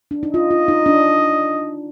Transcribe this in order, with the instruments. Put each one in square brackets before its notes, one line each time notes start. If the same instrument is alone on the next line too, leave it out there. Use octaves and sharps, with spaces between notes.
[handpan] D4
D#4
[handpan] F4 [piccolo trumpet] D#5
[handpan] F4
D#4
D4